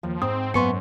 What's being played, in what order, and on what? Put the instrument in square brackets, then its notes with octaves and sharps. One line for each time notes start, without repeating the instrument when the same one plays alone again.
[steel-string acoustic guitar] D#2 [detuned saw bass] F3
[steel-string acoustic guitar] G#2 [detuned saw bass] C4 [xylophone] D#6
[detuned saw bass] F#2 [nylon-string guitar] A#3 B3 G#5 [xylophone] C6 C#6 C#7